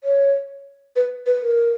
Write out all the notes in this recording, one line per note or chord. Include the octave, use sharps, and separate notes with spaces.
C#5
B4
B4
A#4